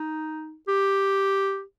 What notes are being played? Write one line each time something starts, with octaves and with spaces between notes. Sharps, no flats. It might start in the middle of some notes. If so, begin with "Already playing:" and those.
Already playing: D#4
G4